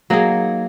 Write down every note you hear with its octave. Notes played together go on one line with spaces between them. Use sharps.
F#3 A#3 D#4 G#4